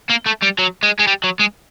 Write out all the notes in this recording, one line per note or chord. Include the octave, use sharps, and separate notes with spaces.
A#3
A3
G3
F#3
G#3
G#3
G3
F#3
G#3